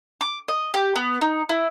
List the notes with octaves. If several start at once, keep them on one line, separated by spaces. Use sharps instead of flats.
D6
D#5
G4
B3
D#4
E4